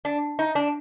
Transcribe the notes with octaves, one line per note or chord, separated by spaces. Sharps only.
D4
D#4
D4